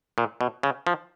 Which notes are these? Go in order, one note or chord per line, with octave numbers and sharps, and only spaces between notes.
A#2
B2
C#3
F3